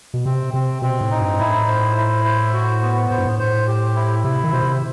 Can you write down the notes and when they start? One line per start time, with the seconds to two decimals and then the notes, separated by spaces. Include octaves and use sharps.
0.14 B2
0.25 C3 C4
0.54 C3 C4
0.82 B2 C4
1.01 A2
1.11 D#4
1.20 G2
1.39 A2 E4
1.68 C5
1.97 E4
2.25 C5
2.53 F#4
2.82 B3
3.10 A2 C5
3.18 G2
3.25 A2
3.39 C5
3.67 G4
3.96 E4
4.24 C3 E4
4.44 D#3
4.53 B2 C5
4.63 C3